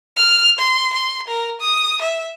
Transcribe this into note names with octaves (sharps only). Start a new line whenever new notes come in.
F6
C6
C6
A#4
D#6
E5